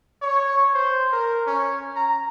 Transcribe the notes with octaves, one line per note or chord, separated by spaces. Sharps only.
C#5
C5
A#4
C#4
A#5